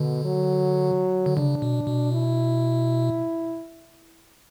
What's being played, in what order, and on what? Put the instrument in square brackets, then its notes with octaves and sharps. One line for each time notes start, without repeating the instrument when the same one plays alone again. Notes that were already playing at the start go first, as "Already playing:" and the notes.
Already playing: [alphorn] B2 [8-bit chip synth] D3
[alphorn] F#3
[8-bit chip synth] D3
[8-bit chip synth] C#3 [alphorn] D4
[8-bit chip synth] B2
B2
[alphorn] E4